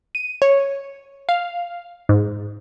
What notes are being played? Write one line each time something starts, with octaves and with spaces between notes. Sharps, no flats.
D#7
C#5
F5
G#2